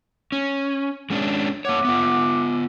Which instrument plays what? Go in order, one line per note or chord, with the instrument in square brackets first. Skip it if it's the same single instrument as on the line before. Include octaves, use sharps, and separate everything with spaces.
[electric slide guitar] C#4
G#3 C#4 D4
[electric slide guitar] A#3 C#5 [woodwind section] E5 F#5 D6
[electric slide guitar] B3 F4